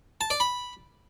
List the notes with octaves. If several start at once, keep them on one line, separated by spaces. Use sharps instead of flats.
A5
D5
B5